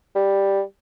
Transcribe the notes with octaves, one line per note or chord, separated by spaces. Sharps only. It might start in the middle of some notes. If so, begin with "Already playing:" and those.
G3